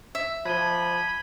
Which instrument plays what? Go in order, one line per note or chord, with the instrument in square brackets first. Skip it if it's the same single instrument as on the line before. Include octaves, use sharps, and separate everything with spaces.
[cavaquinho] E5
[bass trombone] F3 [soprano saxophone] B5 [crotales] G#6 D#7 G7